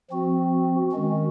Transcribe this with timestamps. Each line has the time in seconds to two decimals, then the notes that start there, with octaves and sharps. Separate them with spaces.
0.10 F3 C4 F#4
0.91 D#3 G#3 C#4 F#4